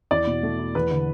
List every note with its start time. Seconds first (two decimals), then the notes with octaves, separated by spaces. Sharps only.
0.11 E2 D5
0.27 B2
0.43 A3
0.59 E4
0.75 E2 B4
0.91 D3